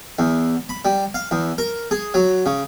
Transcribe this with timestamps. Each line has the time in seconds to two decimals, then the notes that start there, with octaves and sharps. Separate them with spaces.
0.19 E2
0.69 B5
0.85 G3
1.14 F5
1.31 E2
1.58 A#4
1.91 G#4
2.14 F#3
2.46 C#3